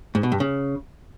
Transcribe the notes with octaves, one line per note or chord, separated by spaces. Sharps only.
G#2
B2
G2
C#3